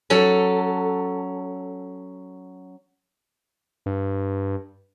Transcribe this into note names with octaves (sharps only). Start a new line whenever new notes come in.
F#3 C#4 A4
G2